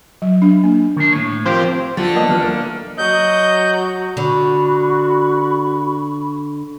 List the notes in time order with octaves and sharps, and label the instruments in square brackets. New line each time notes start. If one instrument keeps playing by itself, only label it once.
[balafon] F#3
D4
A#3
[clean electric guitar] D#3 D4
A2 C#5
[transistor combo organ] F3 C4 [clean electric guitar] G4 A#4 G5
[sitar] D3 A3 [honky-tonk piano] F3
[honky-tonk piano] A#3 B3 D#5
E3 F3 F6
A#3
[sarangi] F#3 [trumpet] D#5 [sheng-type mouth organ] G6
[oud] D3 [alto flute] F#4 [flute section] B5 C#6